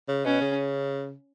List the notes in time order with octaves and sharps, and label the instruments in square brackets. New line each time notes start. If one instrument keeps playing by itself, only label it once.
[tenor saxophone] C#3
[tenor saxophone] B2 [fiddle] C#4
[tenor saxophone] C#3